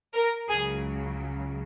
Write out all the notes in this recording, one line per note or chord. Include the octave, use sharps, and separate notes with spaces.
A#4
C#2 C#3 F#3 G#4